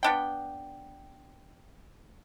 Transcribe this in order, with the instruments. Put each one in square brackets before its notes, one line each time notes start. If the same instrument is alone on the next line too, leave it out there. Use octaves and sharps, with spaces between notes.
[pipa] B3 D4 G5